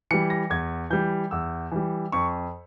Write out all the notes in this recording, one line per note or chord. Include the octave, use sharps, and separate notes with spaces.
E3 G3 C#7
A#6
E2 G#6
E3 G3 G6
E2 E6
E3 G3
F2 C#6